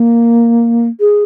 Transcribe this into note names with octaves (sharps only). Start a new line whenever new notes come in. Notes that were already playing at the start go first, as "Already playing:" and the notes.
Already playing: A#3
G#4